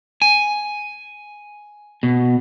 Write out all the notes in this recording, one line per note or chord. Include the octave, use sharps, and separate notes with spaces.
G#5
B2